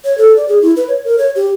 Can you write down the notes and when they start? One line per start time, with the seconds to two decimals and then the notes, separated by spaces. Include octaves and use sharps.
0.04 C#5
0.18 A4
0.36 D5
0.48 G#4
0.62 E4
0.77 B4
0.88 C#5
1.05 A#4
1.18 C#5
1.36 G4